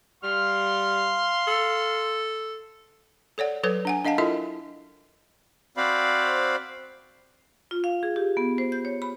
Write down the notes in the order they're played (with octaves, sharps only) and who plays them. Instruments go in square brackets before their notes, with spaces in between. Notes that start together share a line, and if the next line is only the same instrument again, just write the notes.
[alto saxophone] G3 [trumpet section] F5 C6 [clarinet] F6
[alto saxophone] A4
[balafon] A4 C#5 D5 F#5
F#3 A4 B4 C#5
D4 F#5 G#5
D4 D#5 F5 F#5 A5
E4 F4 A4 A#4 D#5 E5
[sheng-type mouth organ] C4 F#4 C5 D5 F5 B5
[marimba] F4
F5
G#4
G4
B3
C5
G6
C#5
B5